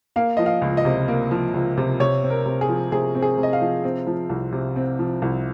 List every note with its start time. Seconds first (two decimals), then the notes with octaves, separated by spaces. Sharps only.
0.16 A#3 F5
0.37 F3 D#5
0.46 F5
0.62 C#2
0.77 D#5
0.85 C3
1.08 A#3
1.31 F3
1.54 C#2
1.77 C3
2.00 C3 C#5
2.23 C4
2.30 A#4
2.46 C3
2.61 G#4
2.69 F3
2.92 C3 G#4
3.15 C4
3.22 G#4
3.38 C3
3.43 D#5
3.53 F5
3.61 F3
3.84 C4
4.07 F3
4.30 C2
4.52 C3
4.76 C4
4.99 F3
5.22 C2